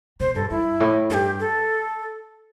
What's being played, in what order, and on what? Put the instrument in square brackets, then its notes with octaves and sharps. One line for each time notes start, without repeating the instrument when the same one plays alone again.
[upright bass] B2 [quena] C5
[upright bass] G2 [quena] A4
[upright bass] G2 [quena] E4
[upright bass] A2
[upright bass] G2 [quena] A4
[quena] G4
A4